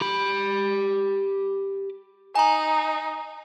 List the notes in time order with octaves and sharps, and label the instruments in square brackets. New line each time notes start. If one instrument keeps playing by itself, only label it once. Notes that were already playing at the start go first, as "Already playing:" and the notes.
[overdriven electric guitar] G4 B5
[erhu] D#4 [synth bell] G#5 A#5